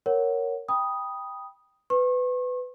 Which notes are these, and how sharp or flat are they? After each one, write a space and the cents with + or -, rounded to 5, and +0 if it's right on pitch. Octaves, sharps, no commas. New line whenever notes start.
A#4 +0 C#5 +0 F#5 +5
G5 +10 B5 -20 D#6 +0
B4 +20 C#6 -40